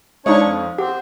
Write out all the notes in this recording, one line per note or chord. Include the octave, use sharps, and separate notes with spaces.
G#3 D4 D#4 C5 C#5 F5 C#6 D#6
F2
C4 G4 F#5